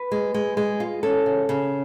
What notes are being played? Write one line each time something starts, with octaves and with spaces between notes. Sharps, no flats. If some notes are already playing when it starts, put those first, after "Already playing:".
Already playing: B4
G#3
G#3
G#3
F4
C#4 A4
C#3
C#3